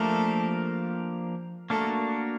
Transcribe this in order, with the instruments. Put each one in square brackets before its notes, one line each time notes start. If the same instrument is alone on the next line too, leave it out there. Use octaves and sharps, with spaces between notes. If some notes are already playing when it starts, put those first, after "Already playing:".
Already playing: [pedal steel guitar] F3 A#3 D4 G4 A#4 [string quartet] A3 A4
[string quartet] A3 A4 [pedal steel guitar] A#3 D4 F#4 A#4